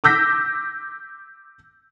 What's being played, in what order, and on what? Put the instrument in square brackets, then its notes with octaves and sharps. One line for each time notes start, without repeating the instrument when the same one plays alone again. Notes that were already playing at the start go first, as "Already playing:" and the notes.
[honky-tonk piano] D6 E6 G6 A#6 B6